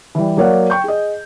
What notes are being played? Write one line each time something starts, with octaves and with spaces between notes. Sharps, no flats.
E3 G3
F#3 A#3 C#5 D5 F5 F#5
G5 C#6 G6
G#4 D#5